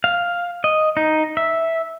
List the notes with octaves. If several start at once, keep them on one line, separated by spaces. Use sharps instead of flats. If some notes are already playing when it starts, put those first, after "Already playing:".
F5
D#5
D#4
E5